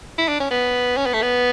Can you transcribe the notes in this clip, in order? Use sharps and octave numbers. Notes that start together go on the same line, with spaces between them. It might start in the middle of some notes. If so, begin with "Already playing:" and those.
E4
D4
C#4
B3
C#4
B3
A3
B3